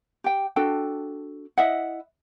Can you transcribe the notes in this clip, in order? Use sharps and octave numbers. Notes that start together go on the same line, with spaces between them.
G4 G5
D4 F#4 A4 G5
E4 D#5 E5 F#5